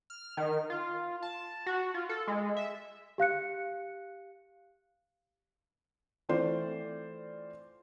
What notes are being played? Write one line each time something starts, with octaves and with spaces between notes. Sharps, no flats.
F6
D#3
F4
A5
F#4
F4
A4
G#3
E5
G4 F5 F#6 C#7
E3 A3 C4 F4 C5 D5